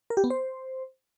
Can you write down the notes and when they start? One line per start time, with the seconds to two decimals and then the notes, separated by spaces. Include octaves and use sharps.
0.10 A#4
0.17 G4
0.24 B3
0.30 C5